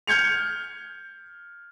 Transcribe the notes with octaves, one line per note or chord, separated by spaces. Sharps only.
F6 G6 G#6 C#7 F7